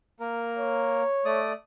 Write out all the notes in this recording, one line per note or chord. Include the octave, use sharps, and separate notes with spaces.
A#3 A#4
C#5
A3 D5 D#6